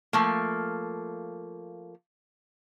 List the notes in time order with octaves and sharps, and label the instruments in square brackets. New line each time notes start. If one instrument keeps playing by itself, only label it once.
[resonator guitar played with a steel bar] F3 A3 A#3